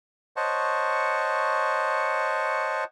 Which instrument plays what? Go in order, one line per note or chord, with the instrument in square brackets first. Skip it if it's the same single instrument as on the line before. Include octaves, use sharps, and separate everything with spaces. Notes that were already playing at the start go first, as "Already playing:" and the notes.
[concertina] C5 C#5 D#5 F#5 A5 C#6